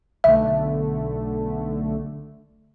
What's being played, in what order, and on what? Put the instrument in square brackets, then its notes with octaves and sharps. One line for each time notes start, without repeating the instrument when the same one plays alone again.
[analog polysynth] B1 D3 A3 [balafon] E5